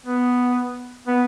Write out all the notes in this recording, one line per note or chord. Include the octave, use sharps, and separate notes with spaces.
B3
B3